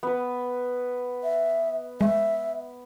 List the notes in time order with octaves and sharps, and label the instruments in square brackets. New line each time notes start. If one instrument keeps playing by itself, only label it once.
[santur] B3 B4
[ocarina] E5
[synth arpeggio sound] G#3 [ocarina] E5